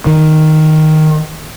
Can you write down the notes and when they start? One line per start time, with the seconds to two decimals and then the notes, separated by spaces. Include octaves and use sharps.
0.06 D#3